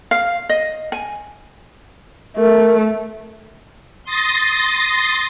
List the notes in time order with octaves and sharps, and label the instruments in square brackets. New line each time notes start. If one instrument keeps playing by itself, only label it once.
[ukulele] F5
D#5
G#5
[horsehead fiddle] A3 [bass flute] A#4
[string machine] C6 D#6 A6 A#6